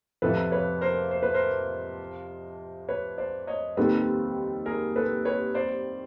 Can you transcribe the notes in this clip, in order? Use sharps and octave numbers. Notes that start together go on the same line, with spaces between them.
F2 C3 F3 A4 B4
B4 C#5
A#4 C5
C5
B4
A#4 C5
B4 C#5
C5 D5
C#5 D#5
D#2 D#3 G3 C4 A4 B4
G#4 A#4
A4 B4
B4 C#5
C5 D5